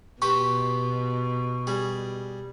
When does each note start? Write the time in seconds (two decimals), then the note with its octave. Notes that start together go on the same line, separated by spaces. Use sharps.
0.22 B2 G4 B4 C5 C#6
1.67 G3 G#4